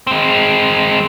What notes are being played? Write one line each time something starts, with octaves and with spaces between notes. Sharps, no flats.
G#3 C4